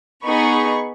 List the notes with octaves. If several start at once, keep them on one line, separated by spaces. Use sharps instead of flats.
B3 D#4 G#4 B5 C#6